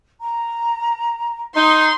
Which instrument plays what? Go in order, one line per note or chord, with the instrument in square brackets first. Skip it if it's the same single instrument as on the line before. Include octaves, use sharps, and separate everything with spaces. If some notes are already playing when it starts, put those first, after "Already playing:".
[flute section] A#5
[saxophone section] D#4 [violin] C6